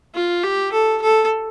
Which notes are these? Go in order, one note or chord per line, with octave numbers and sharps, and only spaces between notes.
F4
G4
A4
A4